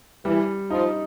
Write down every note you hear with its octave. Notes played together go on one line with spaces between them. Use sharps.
E3 G3
F3 D#4